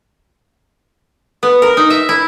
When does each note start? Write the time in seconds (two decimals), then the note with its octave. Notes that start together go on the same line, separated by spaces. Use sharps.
1.43 B3
1.62 A#4
1.77 D#4
1.90 E5
2.09 E4